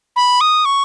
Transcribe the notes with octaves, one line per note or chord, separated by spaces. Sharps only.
B5
D#6
C#6